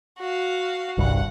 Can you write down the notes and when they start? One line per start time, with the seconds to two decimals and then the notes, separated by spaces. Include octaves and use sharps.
0.19 F#4 F5
0.98 G1 C2 G2 F#5